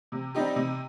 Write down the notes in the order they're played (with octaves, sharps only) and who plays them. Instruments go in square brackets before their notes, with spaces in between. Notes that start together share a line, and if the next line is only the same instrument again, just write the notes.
[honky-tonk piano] C3
G3 C4 D#4 G4
C3